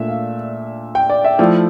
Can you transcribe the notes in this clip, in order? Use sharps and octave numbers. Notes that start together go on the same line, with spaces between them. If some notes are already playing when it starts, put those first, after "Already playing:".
Already playing: A#2 A3 D4 E5
F5
G5
D5
E5
F3 A3 E4 D5